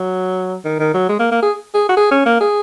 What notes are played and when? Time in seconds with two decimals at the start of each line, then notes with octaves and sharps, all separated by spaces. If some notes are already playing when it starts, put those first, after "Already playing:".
Already playing: F#3
0.64 D#3
0.79 D#3
0.94 F#3
1.09 G#3
1.19 A#3
1.31 A#3
1.42 G#4
1.74 G#4
1.89 F#4
1.97 G#4
2.11 C#4
2.25 A#3
2.41 G#4